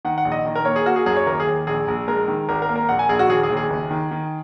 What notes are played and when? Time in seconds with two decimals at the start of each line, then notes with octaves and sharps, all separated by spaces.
0.05 D#3 F#5
0.18 F#5
0.25 A#1
0.32 D#5
0.46 D#3
0.55 A#4
0.65 A#3 C#5
0.76 G#4
0.86 A#3 F#4
0.96 G#4
1.06 F#2 G#4
1.16 C#5
1.27 D#2 A#4
1.40 G#4
1.47 D#2
1.67 A#1 G#4
1.88 A#1
2.08 G#3 A#4
2.28 D#3
2.49 G#1 A#4
2.62 A#4
2.69 A#3
2.76 A#4
2.89 A#1 F#5
2.99 G#5
3.09 A#1 G#4
3.19 F#4
3.29 D#2 G#4
3.43 G#4
3.50 D#2
3.57 G#4
3.70 F#1
3.91 D#3
4.11 D#3